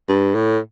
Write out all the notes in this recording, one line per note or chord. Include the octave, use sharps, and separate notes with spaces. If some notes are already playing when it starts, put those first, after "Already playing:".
G2
A2